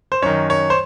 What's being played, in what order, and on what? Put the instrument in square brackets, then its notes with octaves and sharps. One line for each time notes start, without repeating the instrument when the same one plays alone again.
[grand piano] C5
F#2 D#3 C#5
C#5
C5